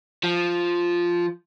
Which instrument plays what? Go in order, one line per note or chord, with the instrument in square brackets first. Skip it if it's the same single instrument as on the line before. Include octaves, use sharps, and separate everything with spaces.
[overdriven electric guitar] F3